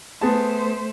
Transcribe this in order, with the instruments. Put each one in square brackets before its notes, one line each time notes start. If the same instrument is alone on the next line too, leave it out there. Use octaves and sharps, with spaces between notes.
[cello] A3 C5 [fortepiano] B3 G#4 A5